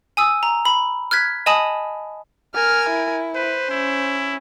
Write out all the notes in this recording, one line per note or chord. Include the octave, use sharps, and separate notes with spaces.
G#5 D#6 E6
A#5
B5
F6 F#6 G#6 B6
D#5 G#5 A5 B5 D#6
A#4 G#5 F6
E4
B4 C5
C#4 E4